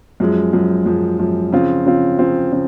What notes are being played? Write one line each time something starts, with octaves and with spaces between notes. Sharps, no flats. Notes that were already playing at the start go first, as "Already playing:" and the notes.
F#2 F3 G#3
F#2 F3 G#3
F#2 F3 G#3
F#2 F3 G#3
C#3 F3 C4 F4
C#3 F3 C4 F4
C#3 F3 C4 F4
C#3 F3 C4